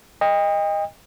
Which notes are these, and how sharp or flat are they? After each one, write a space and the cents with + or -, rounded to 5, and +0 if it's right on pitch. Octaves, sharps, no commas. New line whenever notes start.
D#5 +0 G5 +40